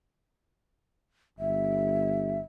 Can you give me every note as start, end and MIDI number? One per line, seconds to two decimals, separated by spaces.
1.39 2.39 31
1.39 2.39 76